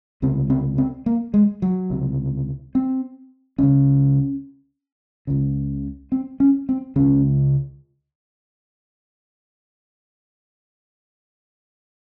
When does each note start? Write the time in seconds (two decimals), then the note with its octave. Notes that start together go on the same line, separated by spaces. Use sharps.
0.22 C#2 C3 C4
0.50 C4
0.78 C4
1.06 A#3
1.34 G#3
1.62 F#3
1.90 C#2 C3
2.75 C4
3.58 C#2 C#3 C#4
5.27 C#2 C#3
6.12 C4
6.40 C#4
6.69 C4
6.96 C#2 C#3 C#4